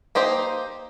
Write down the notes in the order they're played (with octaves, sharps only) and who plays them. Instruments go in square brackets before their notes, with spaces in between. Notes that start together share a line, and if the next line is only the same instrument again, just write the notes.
[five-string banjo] A#3 D#4 G4 C5